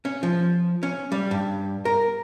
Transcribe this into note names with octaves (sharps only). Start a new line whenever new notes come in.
C#4
F3
C#4
G3
G2
A#4